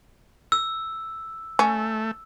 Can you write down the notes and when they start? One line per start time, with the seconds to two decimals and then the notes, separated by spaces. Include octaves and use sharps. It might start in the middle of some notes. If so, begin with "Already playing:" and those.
0.52 E6
1.59 A3 C#4